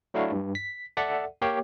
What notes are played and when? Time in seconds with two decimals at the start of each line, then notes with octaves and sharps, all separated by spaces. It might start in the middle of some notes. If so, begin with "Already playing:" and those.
0.14 F#3 A3 D4 E4 F#4 F5
0.32 G2
0.55 B6
0.97 A4 D5 E5 F#5
1.42 A#3 G4 C#5 F5 G5